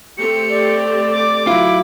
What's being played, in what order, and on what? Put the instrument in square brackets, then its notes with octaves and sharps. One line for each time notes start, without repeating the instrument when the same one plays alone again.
[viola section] A3 C4 G4 [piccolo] C#7
[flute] D5
[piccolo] D6
[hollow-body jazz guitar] F#3 F4 [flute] E4